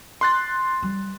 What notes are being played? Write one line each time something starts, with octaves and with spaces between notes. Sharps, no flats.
C6 F#6 A6
G3